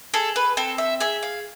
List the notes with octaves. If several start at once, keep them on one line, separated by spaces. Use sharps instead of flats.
G#4 A4
B4
C4 A4
E5
G#4 E5
F5